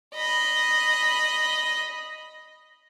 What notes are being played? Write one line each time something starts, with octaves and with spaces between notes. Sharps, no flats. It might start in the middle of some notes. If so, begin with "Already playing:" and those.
D#5 B5